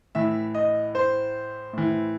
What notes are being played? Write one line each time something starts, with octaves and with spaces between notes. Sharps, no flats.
A2 E3 E5
D#5
C5
A2 E3